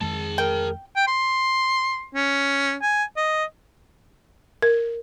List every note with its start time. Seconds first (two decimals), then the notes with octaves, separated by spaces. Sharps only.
0.01 F2 D#3 G#3 G#4 A5
0.38 A#4 G5
0.96 G5
1.07 C6
2.15 C#4
2.82 G#5
3.17 D#5
4.62 A#4